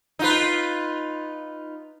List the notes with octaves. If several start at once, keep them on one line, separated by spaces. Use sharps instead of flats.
D#4 F4 B4